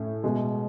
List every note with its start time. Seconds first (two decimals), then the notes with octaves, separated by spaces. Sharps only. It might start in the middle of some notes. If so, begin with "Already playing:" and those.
Already playing: A2 C#4
0.24 B2 G#3